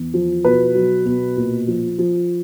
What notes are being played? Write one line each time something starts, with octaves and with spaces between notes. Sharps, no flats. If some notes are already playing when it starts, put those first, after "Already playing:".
Already playing: E2
F3
B2 B4
F#3
B2
A#2
F3
F3